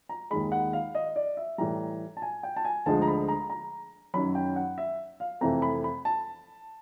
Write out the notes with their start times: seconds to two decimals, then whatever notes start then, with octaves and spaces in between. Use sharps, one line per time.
0.09 A#5
0.30 D#2 D#3 G#3 B5
0.52 F#5
0.73 F5
0.95 D#5
1.16 D5
1.37 E5
1.58 A2 E3 G3 A#5
2.17 A5
2.22 G#5
2.43 G5
2.56 A5
2.65 G#5
2.86 D2 D3 F3 G#3 A5
3.02 A#5
3.08 B5
3.28 A#5
3.50 A#5
4.14 F#2 D#3 F#3 B5
4.35 G5
4.56 F#5
4.78 E5
5.20 F5
5.41 F2 C3 E3 A3 A#5
5.62 B5
5.84 B5
6.05 A5